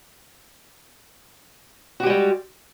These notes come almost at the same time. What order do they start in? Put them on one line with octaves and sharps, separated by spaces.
F#4 G4 G#3 G3